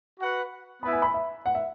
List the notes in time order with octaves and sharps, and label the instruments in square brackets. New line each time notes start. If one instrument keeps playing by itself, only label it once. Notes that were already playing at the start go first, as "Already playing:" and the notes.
[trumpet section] F#4 B4 F#5
[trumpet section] B3 E4 B4 E5 [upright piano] B5
[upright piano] G#5
B5
E5
F#5
E5